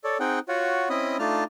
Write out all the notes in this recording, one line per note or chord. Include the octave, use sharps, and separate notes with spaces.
A4 C#5 D5
C4 D#4 G#4 F#5 G5
F4 F#4 C#5 F#5
C4 C#4 E4 D#5 B5 D#6
A3 D4 D#4 F4 A5 F6